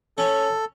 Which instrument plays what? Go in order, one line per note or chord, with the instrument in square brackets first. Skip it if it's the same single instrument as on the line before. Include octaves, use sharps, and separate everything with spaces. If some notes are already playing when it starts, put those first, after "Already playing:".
[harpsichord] C#4 [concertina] A4